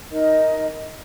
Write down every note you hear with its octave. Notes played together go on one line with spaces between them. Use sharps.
D#4 A#4 D#5